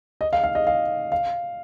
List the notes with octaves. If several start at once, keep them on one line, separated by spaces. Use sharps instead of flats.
D#5
F5
F5
D#5
F5
F5